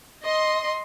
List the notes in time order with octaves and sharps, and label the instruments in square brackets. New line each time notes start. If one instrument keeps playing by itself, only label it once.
[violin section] D#5 C6